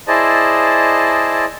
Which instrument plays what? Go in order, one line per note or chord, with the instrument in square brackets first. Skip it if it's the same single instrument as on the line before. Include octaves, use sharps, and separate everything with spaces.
[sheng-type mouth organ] E4 G#4 C5 D5 D#5 A5